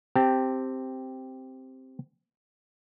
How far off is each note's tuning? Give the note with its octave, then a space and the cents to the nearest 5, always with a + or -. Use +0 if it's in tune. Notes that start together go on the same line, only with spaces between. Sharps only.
C4 +0 G4 +0 A5 +25